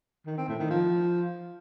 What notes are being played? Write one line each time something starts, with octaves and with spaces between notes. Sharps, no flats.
D#3
C4
A2
D#3
F3